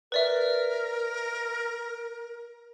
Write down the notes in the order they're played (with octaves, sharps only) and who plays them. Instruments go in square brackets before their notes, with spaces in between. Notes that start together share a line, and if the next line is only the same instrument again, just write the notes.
[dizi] A#4 [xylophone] B4 D5 E5